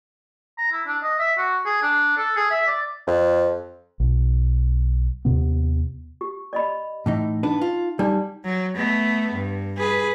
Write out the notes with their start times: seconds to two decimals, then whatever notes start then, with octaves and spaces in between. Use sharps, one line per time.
0.58 A#5
0.72 E4
0.87 D4
1.03 D#5
1.19 E5
1.38 F#4
1.66 G#4
1.82 D4
2.17 A4
2.37 G#4
2.51 E5
2.67 D5
3.07 F2
4.00 B1
5.25 D#2 C3 B3
6.21 G4
6.53 D5 D#5 B5
7.06 A2 E3 D#4
7.43 B3 D4 D#4 B4
7.61 F4
7.99 G3 D4 D#4 D5
8.45 F#3
8.76 A3 B3
9.32 G2
9.78 G#4 B4